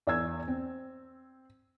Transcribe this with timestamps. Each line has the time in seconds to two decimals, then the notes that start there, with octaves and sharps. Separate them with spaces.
0.07 E2 D5 G#5 E6 G#6
0.48 C4